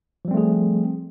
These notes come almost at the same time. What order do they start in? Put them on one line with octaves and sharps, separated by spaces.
F3 G3 C4 A3 G#4